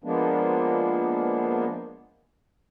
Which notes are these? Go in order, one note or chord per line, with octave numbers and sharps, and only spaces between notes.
F3 G#3 A#3 B3 D4